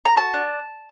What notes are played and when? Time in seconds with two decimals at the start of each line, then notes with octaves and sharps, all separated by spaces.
0.05 A#5
0.16 F#4 A5
0.34 D4